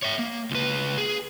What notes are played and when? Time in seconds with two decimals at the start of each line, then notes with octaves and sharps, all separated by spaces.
0.02 C#5 E5
0.19 A#3
0.51 C#2 B4
0.98 G#4